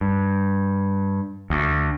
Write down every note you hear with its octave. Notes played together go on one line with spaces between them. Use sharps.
G2
D2